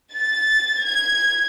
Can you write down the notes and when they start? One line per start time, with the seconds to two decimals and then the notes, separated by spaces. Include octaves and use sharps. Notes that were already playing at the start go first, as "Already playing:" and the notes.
0.13 A6
0.83 G#6